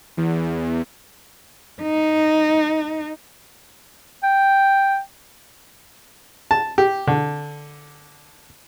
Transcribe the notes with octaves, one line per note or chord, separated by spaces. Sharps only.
E2
D#4
G5
A5
G4
D3